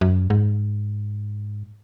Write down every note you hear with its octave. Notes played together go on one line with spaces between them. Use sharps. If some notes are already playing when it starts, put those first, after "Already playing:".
F#2
G#2